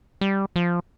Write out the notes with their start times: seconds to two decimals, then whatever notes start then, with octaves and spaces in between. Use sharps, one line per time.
0.21 G3
0.56 F3